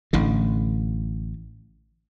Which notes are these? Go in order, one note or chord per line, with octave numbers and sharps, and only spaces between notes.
A1 A2 D3